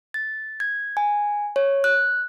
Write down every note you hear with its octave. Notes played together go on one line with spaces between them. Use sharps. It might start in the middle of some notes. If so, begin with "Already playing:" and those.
A6
G#6
G#5
C#5
F#6